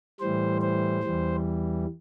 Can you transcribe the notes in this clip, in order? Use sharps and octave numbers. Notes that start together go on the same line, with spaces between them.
A2 E3 G3 C5
C5
E2 E3 G3